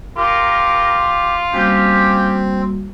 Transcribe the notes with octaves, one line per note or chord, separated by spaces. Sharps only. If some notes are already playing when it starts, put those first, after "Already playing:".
F4 G4 A#4
G3 A#3 C4 C#4 F#4 G4